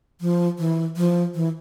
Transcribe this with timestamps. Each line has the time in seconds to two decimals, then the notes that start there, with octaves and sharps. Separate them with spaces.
0.21 F3
0.59 E3
0.97 F3
1.35 E3